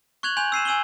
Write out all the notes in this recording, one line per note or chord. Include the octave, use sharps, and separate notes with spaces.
C#6 F#6 G#6 F7 F#7
G#5 C6 G6 F7
E6 C7 D#7 E7
G#5 E6 D#7 F#7 G7